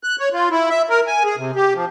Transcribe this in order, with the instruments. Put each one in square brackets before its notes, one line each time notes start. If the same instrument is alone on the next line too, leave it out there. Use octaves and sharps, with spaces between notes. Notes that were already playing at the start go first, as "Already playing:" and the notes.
[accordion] F#6
C#5
F4
E4
E5
A#4
G#5
G#4
C3
G4
F3